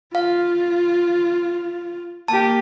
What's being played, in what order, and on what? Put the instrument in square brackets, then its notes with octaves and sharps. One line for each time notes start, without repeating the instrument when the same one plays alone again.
[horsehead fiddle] F4 [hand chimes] F5
[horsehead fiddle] A#3 G4 [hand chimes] A5